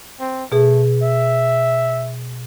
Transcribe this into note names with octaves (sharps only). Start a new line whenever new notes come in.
C4
B2 A3 G#4
E5